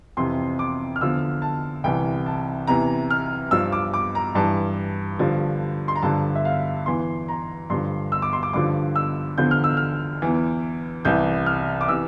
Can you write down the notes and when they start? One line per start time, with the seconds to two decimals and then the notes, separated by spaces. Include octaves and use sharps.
0.17 F2 C3 E3 C6
0.59 D6
0.96 F6
1.01 E2 D3 F3 E6
1.42 A5
1.84 C2 C3 E3 G5
2.26 A5
2.67 E2 C3 E3 A#5
3.10 F6
3.51 G2 F3 E6
3.72 D6
3.94 D6
4.15 A#5
4.35 G2 E3 A5
5.19 G2 D3 F3
5.88 C6
5.96 A#5
6.03 G2 D3 F3 A5
6.35 E5
6.45 F5
6.86 E2 E3 C6
7.28 A#5
7.70 G2 D3 F3 C6
8.12 E6
8.22 D6
8.33 C6
8.43 D6
8.53 G2 D3 F3 D6
8.96 E6
9.38 E2 D3 F3 G6
9.51 F6
9.64 E6
9.77 F6
10.22 E2 E3
11.05 C2 C3 E3 G6
11.46 F6
11.81 D6
11.88 C3 E3 E6